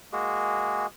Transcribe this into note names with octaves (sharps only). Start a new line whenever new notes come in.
G#3 A#3 F#4 G#4